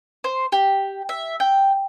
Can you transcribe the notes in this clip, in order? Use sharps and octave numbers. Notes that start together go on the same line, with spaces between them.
C5
G4
E5
G5